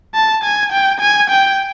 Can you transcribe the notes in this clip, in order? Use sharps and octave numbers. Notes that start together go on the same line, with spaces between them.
A5
G#5
G5
G#5
G5